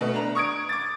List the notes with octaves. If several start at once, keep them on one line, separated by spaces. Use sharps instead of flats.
B2 A3
D4 A#5
C#6 D#6 G#6 D7
D6 A6